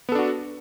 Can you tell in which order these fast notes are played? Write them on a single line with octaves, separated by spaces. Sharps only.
B3 A4 D4 F#4